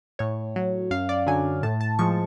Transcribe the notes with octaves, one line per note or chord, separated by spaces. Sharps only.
A2 C#5
F#3
F#2 F5
D5
D3 F#3 G#5
A2 A5
A5
F3 G#3 C#6